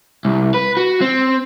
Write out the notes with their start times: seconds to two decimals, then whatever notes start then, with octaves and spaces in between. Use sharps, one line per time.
0.25 C2
0.54 B4
0.77 F#4
1.01 C4